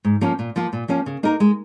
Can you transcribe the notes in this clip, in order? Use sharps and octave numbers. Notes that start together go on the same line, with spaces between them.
G#2
F3 A#3 C#4
A#2
F3 A#3 F4
A#2
F3 A#3 C#4
C#3
A#3 D#4 A#4
G#3